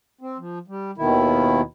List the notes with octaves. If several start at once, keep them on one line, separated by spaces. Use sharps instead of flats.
C4
F3
G3
D#2 B2 D#3 E4